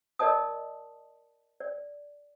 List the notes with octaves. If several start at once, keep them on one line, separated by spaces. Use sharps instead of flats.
A#4 D5 D#5 A5 D#6
D5